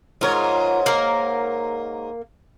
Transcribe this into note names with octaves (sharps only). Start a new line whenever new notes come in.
G#2 F4 A#4 C#5
A#3 A#4